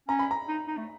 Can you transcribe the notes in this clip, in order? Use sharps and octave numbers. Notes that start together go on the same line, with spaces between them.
C#4 A#5
B5
A#5
D#4
D#4
A3